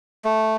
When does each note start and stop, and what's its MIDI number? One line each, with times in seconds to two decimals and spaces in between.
0.25 0.56 57